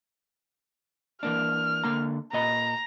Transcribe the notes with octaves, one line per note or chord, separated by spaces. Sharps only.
E3 A#3 D4 F6
D3 A#3 A#5
A#2 D#5 A#5 B5